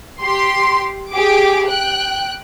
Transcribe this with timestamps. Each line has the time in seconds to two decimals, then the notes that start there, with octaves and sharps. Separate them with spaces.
0.21 G4 C6
1.12 G4 G#4 D6
1.65 G5 F#6